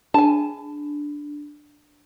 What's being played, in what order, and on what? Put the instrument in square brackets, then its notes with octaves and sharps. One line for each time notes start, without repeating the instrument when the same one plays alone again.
[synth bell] D4 [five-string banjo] G#5 A5